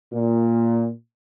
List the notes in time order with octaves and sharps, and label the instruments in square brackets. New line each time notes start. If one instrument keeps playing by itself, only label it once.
[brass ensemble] A#2